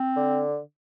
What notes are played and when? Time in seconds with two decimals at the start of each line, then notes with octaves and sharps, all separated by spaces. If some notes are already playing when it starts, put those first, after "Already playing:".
Already playing: C4
0.16 D3